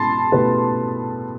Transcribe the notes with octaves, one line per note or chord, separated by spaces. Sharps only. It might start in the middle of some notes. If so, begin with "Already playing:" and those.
Already playing: B2 A3 E4 A5 B5 C6
B2 A3 E4 G4 B4